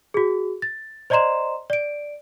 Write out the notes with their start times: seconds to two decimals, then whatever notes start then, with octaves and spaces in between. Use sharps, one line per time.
0.14 F#4 G#4
0.62 A6
1.10 C5 D5 D#5 A#5 C6 E7
1.70 D5 D7